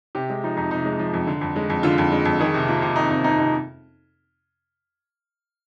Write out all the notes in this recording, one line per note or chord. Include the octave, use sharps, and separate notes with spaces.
C3 G4
G#3
F3 D#4
F2 D#4
C3 D#4
G#3
F3
F2
D3
F2
G#3
F2
D3 F4
F2
G#3
F2
D#3 G#4
C3
A#3 F4
C3
D#3 D#4
C3 D#4
A#3 D#4
C3 D#4